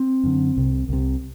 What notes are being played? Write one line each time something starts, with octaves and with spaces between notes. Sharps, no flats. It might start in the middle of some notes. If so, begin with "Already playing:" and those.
Already playing: C4
F#2 D3
C2 C3
C2 C3